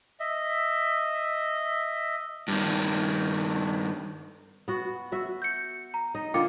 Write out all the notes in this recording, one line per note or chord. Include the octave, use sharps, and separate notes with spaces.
D#5 E5
G2 D#3
B3 F#4
F#4 E5
G6 C#7
A#5
D#4
D3 A#3 F4 G5 D6 C#7